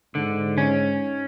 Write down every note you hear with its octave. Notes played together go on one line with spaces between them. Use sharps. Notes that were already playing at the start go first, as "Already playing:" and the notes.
G#2 D3
C#4